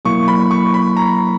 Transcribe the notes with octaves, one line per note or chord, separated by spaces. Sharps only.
B2 F#3 A#3 E4 C#6
B5
C#6
B5
A#5